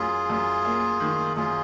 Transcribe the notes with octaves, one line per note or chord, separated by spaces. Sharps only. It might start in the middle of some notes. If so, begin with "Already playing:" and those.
Already playing: F#2 F4 G#4
F#2
A#3
D#3
F#2 F4 G#4